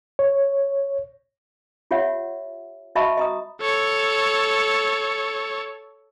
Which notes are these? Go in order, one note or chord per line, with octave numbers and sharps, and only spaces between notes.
C#5
F4 G4 C#5 E5 F#5
F#4 D#5 E5 A5 B5 C#6
D#5 A#5 D#6
A4 C#5